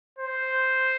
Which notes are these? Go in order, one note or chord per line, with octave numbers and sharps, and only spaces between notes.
C5